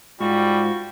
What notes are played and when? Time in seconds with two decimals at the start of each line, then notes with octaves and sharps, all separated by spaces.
0.20 G#2 G3 F4 F#4